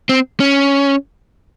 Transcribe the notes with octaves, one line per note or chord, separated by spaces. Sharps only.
C4
C#4